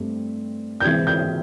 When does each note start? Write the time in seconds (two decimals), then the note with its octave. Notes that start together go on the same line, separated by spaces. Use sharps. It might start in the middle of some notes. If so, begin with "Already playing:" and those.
Already playing: G2 A3 C4
0.80 G6
0.84 C3 E3 G#3 C4 G#6
1.07 G6